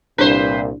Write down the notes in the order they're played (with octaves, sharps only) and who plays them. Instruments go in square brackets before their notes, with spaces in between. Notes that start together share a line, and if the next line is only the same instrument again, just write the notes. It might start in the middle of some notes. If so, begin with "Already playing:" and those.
[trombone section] C2 A#2 [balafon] D4 [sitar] B4 C5